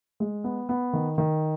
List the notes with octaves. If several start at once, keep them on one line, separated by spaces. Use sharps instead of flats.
G#3
B3
B3
D#3
D#3